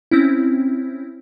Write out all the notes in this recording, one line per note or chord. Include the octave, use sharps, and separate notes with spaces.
C4 C#4 E4